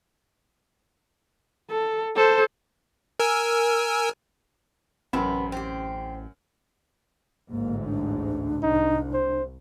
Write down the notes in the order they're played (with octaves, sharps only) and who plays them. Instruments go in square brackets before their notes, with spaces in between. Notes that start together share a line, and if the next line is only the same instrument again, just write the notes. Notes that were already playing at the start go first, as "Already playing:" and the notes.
[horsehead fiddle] A4
A4 C5
[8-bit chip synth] A#4 G#5 E6
[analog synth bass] A1 [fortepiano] F#2 [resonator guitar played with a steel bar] C3 B3
[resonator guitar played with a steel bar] C4 G4
[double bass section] A1 D2 G#2 [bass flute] A#3
[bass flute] D4
[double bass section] C2 [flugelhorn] D#4
[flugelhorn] C5